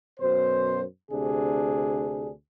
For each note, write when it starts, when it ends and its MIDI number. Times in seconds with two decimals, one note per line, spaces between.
0.20 0.83 42
0.20 0.83 47
0.20 0.83 72
1.11 2.31 38
1.11 2.31 48
1.11 2.31 62
1.11 2.31 68